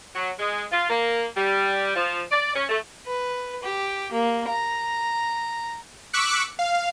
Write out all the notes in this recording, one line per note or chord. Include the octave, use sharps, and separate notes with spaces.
F#3
G#3
F4
A#3
G3
F3
D5
C#4
A3
B4
G4
A#3
A#5
C#6 D6 E6 F#6 B6 C#7
F5